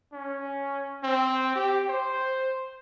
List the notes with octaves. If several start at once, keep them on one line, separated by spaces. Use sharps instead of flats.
C#4
C4
G4
C5